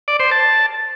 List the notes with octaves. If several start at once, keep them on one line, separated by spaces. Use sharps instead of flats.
D5
C5
A5